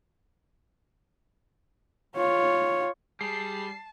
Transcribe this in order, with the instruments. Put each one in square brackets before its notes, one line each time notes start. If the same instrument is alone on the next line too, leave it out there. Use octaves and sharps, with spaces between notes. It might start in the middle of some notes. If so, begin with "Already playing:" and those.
[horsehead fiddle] F4 C#5
[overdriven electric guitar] G3 [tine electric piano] G#4 [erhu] A5 [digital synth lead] C7